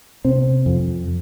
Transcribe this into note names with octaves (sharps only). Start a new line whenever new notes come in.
C3 C4
F2